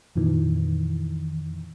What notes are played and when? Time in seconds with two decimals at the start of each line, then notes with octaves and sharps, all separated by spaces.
0.15 F2 A#2 D#3 E3